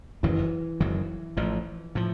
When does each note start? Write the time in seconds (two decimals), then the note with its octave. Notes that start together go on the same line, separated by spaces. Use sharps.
0.23 F#1 F#2 D#3 E3 F#3
0.81 F#1 F#2 D#3 F#3
1.37 A1 A2 F3
1.95 A2 F3